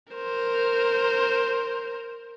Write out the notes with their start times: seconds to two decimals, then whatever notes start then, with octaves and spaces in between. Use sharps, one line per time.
0.13 A#4 C5